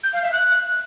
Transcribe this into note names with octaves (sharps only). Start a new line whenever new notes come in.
G6
F5
E5
F#6